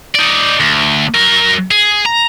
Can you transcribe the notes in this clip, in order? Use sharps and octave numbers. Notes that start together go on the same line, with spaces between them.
D#4 D5
D2
F#3 A#4
G#4
A#5